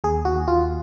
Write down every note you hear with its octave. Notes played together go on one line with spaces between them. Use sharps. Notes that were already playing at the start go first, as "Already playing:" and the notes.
D#2 G#4
D#2 F#4
D#2 F4